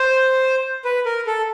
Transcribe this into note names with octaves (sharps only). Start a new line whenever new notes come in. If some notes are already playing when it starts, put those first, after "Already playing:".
Already playing: C5
B4
A#4
A4